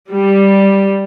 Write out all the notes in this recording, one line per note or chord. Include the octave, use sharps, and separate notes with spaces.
G3